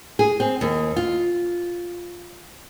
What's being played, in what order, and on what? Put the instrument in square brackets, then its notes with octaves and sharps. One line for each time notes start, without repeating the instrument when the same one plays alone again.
[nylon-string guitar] G#4
C4
D#2
F4